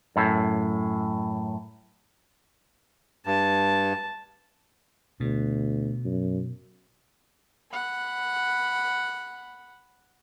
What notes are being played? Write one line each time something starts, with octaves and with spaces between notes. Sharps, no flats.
F#2 A2
G2 A5
D2 B2
F#2
F#5 B5